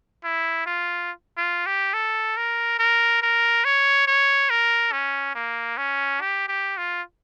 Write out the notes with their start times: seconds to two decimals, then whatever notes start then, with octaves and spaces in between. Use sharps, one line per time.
0.24 E4
0.66 F4
1.37 F4
1.66 G4
1.94 A4
2.37 A#4
2.79 A#4
3.22 A#4
3.65 C#5
4.07 C#5
4.50 A#4
4.92 C#4
5.35 A#3
5.77 C#4
6.21 G4
6.48 G4
6.78 F4